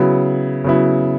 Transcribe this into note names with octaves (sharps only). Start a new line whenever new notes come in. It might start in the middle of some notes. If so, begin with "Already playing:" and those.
Already playing: C#3 F#3 B3 E4
C#3 F#3 B3 E4